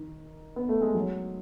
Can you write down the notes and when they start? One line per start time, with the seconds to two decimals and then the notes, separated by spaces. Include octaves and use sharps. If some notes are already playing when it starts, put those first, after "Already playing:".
Already playing: D#3
0.56 B3
0.69 A3
0.82 G#3
0.94 F#3